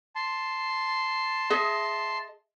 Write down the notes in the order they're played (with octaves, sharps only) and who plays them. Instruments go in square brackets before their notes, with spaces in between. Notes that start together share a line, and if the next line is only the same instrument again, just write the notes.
[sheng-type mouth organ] A5 C6
[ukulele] G#4 D#5 E5